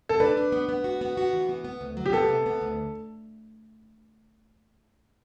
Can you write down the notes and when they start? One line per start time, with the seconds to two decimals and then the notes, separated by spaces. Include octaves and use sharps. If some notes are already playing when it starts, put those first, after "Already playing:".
0.09 A4
0.20 D4 B4
0.37 D4
0.52 B3
0.69 B3
0.84 F#4
1.01 B3
1.17 F#4
1.33 E3
1.49 B3
1.64 B3
1.81 D2
1.97 F#3
2.06 G4
2.13 B3 A4
2.29 C3
2.46 B3
2.61 D2